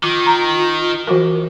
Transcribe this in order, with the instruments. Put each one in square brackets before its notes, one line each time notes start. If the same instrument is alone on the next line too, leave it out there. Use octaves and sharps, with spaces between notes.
[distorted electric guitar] D#3 [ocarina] F4 [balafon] D6
[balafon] A#5
E3 F#4 A#4